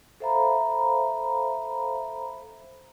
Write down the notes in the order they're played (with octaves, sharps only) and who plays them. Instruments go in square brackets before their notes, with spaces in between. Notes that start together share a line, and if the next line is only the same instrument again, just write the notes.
[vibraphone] A4 C5 E5 F5 A#5 B5